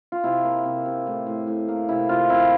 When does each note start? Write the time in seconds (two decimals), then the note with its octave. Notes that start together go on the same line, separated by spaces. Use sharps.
0.12 F4
0.24 C3 E4
0.44 A#3
0.65 C3
0.86 C3
1.07 A2
1.27 A2
1.47 A2
1.68 A#3
1.89 C3 E4
2.09 C3 F4
2.30 C3 E4